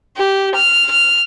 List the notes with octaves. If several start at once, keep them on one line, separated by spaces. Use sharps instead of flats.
G4
F6
F6